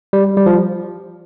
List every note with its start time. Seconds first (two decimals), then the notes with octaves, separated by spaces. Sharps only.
0.13 G3
0.37 G3
0.46 F3